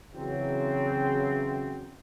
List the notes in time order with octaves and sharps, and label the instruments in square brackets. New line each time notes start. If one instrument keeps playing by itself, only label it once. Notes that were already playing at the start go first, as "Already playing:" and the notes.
[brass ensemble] C#3 E3 F#3 C4